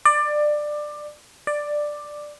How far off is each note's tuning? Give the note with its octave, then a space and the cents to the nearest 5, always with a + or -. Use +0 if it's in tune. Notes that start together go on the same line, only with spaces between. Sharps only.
D5 +20
D5 +10